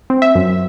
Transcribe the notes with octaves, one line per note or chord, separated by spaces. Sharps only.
C4
E5
F#2